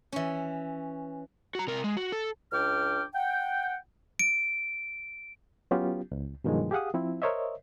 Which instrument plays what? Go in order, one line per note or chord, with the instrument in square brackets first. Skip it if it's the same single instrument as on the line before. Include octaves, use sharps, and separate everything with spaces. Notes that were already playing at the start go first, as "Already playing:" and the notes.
[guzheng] E3 C#4
[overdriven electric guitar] F#4 A#5
C3 A#4
G#3
F#4
A4
[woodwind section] C#2 D4 G5 D6 F6
F#5 G5
[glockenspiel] D7
[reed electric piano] F#3 B3 C#4 F4 G4
C#2
G2 B2 D#3 F3 F#3 G#3
G4 G#4 F5 F#5 D#6
F3 C4 E4
A#4 C5 C#5 D#5 E5